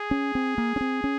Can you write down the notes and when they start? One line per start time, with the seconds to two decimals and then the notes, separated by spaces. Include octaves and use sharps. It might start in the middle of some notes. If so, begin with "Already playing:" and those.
Already playing: G#4
0.11 C#4
0.35 C4
0.58 A#3
0.76 C#4
0.81 C4
1.04 C#4